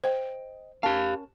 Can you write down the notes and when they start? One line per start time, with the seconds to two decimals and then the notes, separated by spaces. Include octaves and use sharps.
0.04 C5 D#5 G5
0.83 C#4 G4 A#4 F5 A5